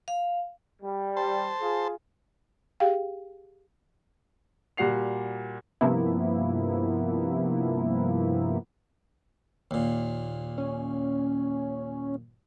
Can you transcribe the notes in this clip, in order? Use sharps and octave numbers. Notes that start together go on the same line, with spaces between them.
F5
G3
C5 A5
F4 G#4
G4 G#4 F5 G5
A#2 G3 F#4 F#5 C7 F7
G2 C3 F3 A#3 B3 E4
D#2 A#2
C#4